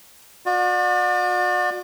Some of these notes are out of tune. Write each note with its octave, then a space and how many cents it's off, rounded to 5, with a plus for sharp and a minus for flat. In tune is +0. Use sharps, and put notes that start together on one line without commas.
F#4 -40 D5 +30